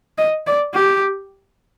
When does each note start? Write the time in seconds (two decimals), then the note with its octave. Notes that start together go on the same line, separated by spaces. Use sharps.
0.18 D#5
0.46 D5
0.74 G4